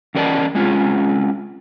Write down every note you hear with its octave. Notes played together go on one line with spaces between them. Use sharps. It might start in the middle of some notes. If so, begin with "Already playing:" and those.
E2 C#4 A#4 D5 D#5 A5
G#3 C4 C#4 F4